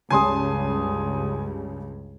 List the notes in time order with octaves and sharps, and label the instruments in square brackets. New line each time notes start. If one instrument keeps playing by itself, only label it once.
[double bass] C#2 G2 [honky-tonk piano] C#3 G3 A5 [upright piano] G#5 C6 D#6